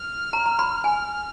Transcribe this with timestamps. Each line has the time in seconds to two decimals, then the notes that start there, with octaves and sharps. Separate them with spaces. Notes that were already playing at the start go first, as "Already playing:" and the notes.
Already playing: F6
0.33 A#5
0.46 A#5
0.59 B5
0.84 G#5 F6